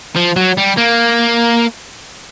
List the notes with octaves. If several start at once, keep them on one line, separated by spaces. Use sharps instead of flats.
F3
F#3
G3
A#3